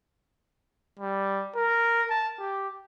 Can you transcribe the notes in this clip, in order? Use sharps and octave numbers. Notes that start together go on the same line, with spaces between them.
G3
A#4
A5
G4